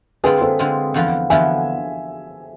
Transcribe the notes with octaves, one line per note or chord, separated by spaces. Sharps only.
D3 G#3 C4 F4 G#4 B4
A4 C5
D3 G#3 C4 F4
E2 D3 F3 B3 F4
E2 D3 F3 B3 F4 E5 G#5